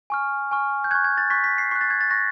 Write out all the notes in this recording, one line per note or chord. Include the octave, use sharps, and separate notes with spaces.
G#5 C#6 F6
G#5 C#6 F6
G6
C#6 F#6 G#6
G#6
A6
C#6 F#6 B6
B6
C7
C#6 F#6 C7
A6
G#6
A6
C#6 F#6 A#6